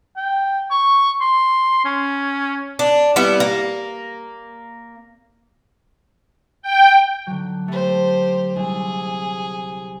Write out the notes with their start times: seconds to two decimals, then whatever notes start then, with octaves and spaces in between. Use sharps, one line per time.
0.17 G5
0.71 C#6
1.21 C6
1.85 C#4
2.79 D4
3.16 G3 B3 E4
3.40 A#3
6.62 G5
7.27 D3 F#3
7.68 A3 G4 C5
8.56 C2 G#4